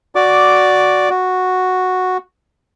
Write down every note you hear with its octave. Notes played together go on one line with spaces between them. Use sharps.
F#4 D5 D6
F#4